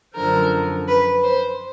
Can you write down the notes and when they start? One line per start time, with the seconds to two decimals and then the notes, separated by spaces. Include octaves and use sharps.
0.15 F#2 D3 F3 A#4
0.88 B4
1.23 C5